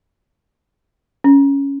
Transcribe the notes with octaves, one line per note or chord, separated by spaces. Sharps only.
C#4